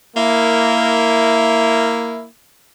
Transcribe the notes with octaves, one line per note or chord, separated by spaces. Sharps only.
A#3 E4